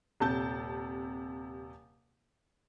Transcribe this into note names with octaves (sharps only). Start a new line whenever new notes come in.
D#1 C3 A5 G6